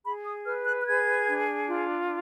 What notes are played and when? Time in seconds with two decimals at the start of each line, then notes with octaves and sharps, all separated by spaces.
0.05 G#4 B5
0.26 D#6
0.46 B4 F6
0.66 F#6
0.81 F#6
0.86 G#4 G#6
1.27 D4
1.68 F4